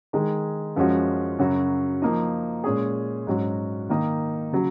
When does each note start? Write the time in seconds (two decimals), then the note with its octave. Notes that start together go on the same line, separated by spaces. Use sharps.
0.13 D#3 G#3 D#4 G#4
0.76 F#2 F3 G#3 C#4 F#4
1.38 F#2 C#3 F#3 C#4 F#4
2.02 F3 A#3 D#4
2.64 A#2 G#3 C#4 G#4
3.27 G#2 F#3 C#4 F#4
3.89 D#3 A#3 D#4
4.52 C#3 F#3